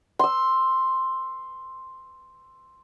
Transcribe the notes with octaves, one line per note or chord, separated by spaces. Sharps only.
C6 E6